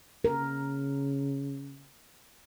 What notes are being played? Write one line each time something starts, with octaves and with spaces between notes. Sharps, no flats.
C#3 A#4